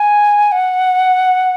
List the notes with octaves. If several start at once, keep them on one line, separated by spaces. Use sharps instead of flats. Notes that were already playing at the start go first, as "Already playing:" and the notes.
Already playing: G#5
F#5